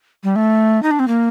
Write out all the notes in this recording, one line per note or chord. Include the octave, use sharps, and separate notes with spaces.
G3
A3
D#4
D4
C4
A#3